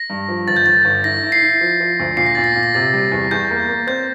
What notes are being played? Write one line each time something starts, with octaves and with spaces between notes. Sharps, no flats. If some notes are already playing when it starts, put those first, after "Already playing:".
Already playing: A#6
G2
F3
G1 A6
G6
G1 A6
G1
E4 A#6
E4
C7
E4
F3
F3
D2
A#2 C7
A#6
A#2 A6
A#6
A#2
A#6
C3 A6
G3
E2
E2 G6
A#3
A#3
C4 G6